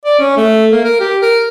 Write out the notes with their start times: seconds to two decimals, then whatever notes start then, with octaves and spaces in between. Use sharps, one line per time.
0.05 D5
0.19 C#4
0.37 A3
0.72 A#3
0.84 A#4
1.00 G4
1.22 A#4